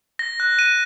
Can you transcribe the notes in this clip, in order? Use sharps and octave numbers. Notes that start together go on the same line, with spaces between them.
A#6
F#6
D#7